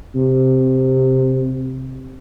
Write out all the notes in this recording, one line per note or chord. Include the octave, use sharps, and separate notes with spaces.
C3